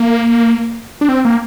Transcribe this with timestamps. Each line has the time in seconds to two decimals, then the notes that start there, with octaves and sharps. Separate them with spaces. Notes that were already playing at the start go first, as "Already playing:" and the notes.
Already playing: A#3
1.01 D4
1.09 C4
1.25 A#3